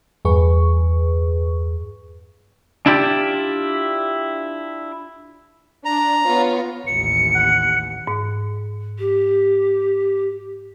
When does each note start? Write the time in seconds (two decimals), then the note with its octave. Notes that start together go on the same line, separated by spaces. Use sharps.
0.25 E2 G2 G#4 B4 C#6
2.86 D4 E4 F4 G4 D5
5.85 D4 A#5
6.27 B3 F4 C#5
6.87 A1 D#2 C#7
7.35 F#5
8.07 G#2
8.99 G4